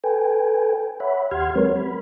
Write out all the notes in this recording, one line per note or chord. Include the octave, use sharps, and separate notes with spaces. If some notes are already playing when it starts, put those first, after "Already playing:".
A4 B4 G5 G#5
C#5 E5 F#5 B5
D#2 G4 F#5 C6 F6 G#6
F#3 G#3 C4 A#4 B4 C#5
B5